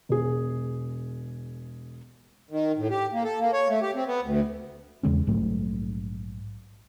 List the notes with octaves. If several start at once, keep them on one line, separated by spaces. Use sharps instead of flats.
E1 G#4
D#3
A2
G4
A#3
A4
A#3
C#5
A3
G4
C4
B3
D2
E2 C#3 G#3 C#4
A#1 G#2 F#3 A3